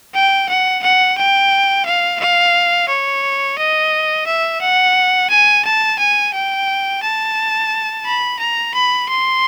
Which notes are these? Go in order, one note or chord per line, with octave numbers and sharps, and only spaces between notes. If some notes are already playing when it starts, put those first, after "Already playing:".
G5
F#5
F#5
G5
F5
F5
C#5
D#5
E5
F#5
G#5
A5
G#5
G5
A5
B5
A#5
B5
C6